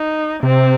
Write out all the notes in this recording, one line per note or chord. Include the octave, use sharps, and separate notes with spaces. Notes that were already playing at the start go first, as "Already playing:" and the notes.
Already playing: D#4
C3 C4